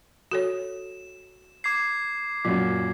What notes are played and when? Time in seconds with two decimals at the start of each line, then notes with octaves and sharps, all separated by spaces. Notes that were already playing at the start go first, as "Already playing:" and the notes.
0.31 F#4 A4 C#5 E7
1.64 D6 G#6 C7
2.45 F#2 A#2 F#3